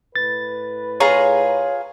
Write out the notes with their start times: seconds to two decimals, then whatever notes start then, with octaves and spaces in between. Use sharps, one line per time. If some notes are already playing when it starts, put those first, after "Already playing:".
0.16 A2 B4 A6
1.00 F4 G#4 C#5 A#5